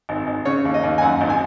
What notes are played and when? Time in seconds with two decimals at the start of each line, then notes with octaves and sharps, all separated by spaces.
0.09 G#1
0.27 G#1
0.45 C#3 C#5
0.65 D#2
0.74 D#5
0.83 D#2
0.98 G#5
1.02 F#2 F#5
1.21 G#1
1.30 G#5